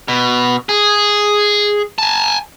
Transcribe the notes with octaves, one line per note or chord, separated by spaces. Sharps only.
B2
G#4
G#5 A5